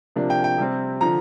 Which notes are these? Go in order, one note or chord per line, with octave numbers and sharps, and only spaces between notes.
C3 F3 A#3 D4
G5
G5
C3 G3 C4
D3 F3 A#5